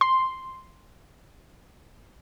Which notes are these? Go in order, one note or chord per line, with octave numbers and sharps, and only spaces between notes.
C6